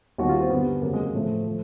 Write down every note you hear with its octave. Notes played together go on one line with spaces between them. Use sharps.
D#2 D#3 G3 F#4
F4
C4
G2 D3 G3 B3
F2 C#3 F#3 A#3
G#3
A2 F3 A3
F3